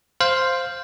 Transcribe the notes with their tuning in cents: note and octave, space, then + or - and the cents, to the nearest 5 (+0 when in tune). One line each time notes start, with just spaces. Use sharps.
C5 +0 F5 +0